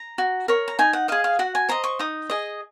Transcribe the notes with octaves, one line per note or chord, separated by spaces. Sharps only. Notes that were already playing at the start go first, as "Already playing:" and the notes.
Already playing: A#5
F#4
A#4 C#5
A#5
D#4 G#5
F#5
G#4 D#5 F5
F5
F#4 F#5
G#5
C5 D#5 A#5
C#6
D#4 D#6
G#4 D#5